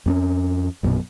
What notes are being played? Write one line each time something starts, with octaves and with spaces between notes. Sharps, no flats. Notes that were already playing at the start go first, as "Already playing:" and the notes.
F2 B3 C#4
A#1 F#2 B2